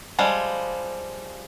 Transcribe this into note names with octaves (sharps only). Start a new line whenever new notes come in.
F3 G3 G#3